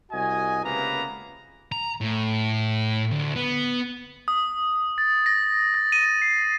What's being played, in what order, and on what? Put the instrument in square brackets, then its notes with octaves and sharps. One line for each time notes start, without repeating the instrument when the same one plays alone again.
[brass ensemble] C2 F#4 D#5 G#5
C#2 C3 A#3 B3 B4 A#5
[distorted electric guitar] A#5
A2
D2
B3
[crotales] D#6
A6
A#6
A6
D#7
C7